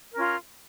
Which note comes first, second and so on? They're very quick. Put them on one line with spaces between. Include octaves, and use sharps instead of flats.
A#4 C#4 F4